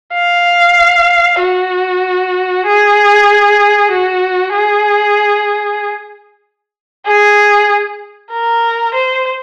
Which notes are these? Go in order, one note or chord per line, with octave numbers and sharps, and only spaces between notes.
F5
F#4
G#4
F#4
G#4
G#4
A#4
C5